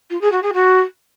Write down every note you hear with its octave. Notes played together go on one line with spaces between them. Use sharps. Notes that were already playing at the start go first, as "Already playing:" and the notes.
F4
G#4
F#4
G#4
F#4